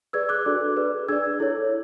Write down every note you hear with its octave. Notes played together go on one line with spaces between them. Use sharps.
G#4 B4 D5 E6 G#6
D6 F#6
D4 F#4 A4 D5
G#4 B4 D5
D4 G#4 D5 E6 G#6
E4 A4 C#5